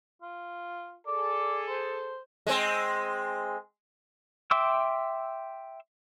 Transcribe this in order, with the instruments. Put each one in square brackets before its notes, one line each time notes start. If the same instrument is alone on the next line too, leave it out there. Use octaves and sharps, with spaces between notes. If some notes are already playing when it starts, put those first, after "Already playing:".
[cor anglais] F4
[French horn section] G#4 A4 [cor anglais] D5
[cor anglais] C5
[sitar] G#3 C4
[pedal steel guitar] E5 G5 C6 D6 E6